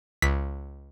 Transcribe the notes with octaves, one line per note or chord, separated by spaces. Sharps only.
C#2 B6